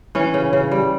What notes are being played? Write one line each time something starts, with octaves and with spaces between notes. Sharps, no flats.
E3 C#4
C#3
C#3
G3